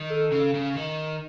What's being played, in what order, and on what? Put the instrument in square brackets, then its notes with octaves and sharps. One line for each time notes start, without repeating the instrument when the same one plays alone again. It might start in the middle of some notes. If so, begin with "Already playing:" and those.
Already playing: [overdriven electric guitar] D#3
[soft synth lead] A4
[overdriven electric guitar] C#3
C#3
D#3